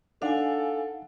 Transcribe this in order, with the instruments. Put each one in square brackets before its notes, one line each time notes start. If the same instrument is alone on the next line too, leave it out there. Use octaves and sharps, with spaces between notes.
[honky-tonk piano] D4 [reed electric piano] D#4 F#5 [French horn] A4 [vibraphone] F5 G#5